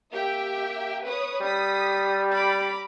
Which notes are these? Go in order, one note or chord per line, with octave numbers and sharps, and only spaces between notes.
A#3 G4 E5 G5
B4 C#5 D#6
G3 D#6 B6
A#5 B5 D6